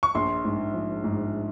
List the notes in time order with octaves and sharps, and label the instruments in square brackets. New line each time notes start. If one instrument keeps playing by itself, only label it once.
[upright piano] C#6
A#1 C6
G#2
F3
G#2